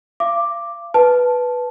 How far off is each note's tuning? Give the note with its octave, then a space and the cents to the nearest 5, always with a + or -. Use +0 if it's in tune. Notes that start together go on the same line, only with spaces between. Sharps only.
F5 -35 D6 +5
B4 +0 A5 -10